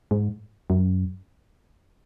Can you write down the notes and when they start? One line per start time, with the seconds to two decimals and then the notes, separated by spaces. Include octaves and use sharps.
0.11 G#2
0.70 F#2